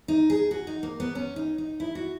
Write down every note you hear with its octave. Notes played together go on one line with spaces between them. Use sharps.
D#4
G#4
F#4
D#4
A#3
B3
C#4
D#4
D#4
E4
F#4